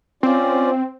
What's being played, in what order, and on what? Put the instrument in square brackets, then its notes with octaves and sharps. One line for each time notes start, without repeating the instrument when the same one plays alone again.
[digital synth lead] C4 [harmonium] C#4 F4 D5